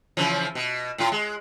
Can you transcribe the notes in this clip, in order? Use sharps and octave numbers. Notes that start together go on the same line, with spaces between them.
C#3 E3 F3
B2
A2 F4
G#3